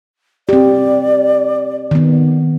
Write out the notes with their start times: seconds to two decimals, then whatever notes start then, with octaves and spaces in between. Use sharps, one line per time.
0.49 C4 G4 D5
1.91 D#3 B3